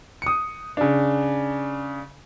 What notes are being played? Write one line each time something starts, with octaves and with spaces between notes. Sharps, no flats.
D#6 C#7
C#3 D4